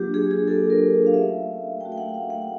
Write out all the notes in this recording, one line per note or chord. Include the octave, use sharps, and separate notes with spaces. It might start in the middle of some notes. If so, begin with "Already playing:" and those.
Already playing: F#3 A#3 D4 F4 G4
G#4
G#4
F#3 A#3 D4 F4 A4
A#4
F5
A3 C#4 F#4 E5
A3 C#4 F#4 G5
G5
F#5
F5
F#5